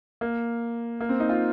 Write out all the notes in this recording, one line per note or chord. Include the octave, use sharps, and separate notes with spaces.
A#3
A#3
C4
D#4
F4